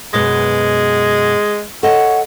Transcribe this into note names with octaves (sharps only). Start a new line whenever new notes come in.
F#2 B2 G#3 B3
A4 C#5 D#5 F#5